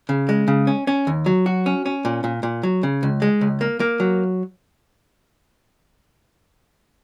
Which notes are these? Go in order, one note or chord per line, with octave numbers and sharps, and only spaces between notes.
C#3
G#3
C#3
C#4
C#4
D#2
F#3
F#4
C#4
C#4
A#2
A#2
A#2
F#3
C#3
C#2
G#3
C#2
A#3
A#3
F#3